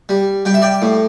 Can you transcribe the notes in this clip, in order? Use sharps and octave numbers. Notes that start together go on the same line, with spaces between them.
G3
G3 G5
E5
D5 G5
A2